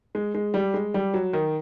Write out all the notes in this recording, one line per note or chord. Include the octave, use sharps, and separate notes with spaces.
G#3
G#3
G3
G#3
G3
F#3
D#3